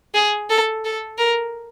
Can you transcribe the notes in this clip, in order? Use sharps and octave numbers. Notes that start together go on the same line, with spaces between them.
G#4
A4
A4
A#4